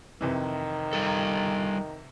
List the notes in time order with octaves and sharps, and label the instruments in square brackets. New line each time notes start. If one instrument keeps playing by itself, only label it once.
[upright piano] F2 C3 E3 [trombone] D#3
[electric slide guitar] G3 A4